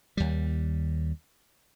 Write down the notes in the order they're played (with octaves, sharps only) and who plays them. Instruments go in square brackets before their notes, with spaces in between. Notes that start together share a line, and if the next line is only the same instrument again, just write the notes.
[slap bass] D#2 G3